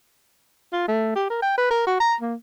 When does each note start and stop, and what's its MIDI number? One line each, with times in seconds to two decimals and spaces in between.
0.73 0.87 65
0.88 1.12 57
1.16 1.26 67
1.30 1.40 70
1.42 1.53 79
1.58 1.70 71
1.70 1.83 70
1.87 1.96 66
2.00 2.15 82
2.21 2.34 58